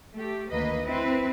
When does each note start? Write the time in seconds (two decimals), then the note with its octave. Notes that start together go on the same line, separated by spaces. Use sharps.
0.13 A3 G4
0.51 D2 D#3 A#3 B4 D#5
0.86 C4 E4 B4